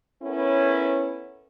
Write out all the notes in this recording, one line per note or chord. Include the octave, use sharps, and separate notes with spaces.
B3 C#4 E4 A4 A#4 C#5